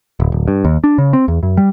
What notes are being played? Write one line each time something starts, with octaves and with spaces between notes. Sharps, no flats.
D1
D1
G2
D#2
D4
C#3
C4
E2
F#2
G3